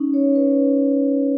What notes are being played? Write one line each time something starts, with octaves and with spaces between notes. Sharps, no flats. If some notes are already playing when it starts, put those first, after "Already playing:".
Already playing: C#4 D#4
C#5
B4